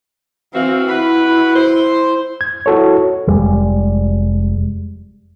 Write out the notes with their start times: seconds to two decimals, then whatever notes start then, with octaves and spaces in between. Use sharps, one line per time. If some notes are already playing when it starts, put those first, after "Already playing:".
0.53 E3 C4 F#4 F5
0.88 E4 F#4 B4 B5
1.55 C5
2.41 G#6
2.66 E4 F#4 A4 C#5
3.28 F1 G3 G#3